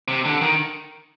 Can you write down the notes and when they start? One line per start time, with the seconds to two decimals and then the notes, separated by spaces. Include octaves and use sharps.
0.08 C3
0.25 D3
0.41 D#3